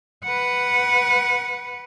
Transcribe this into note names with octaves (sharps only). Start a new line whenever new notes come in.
B4 F#5